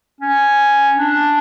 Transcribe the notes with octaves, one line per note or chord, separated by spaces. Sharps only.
C#4
D4